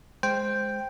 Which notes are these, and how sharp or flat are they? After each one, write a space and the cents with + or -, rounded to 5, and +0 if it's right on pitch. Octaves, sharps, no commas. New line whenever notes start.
G#3 +0 C5 +0 G5 +0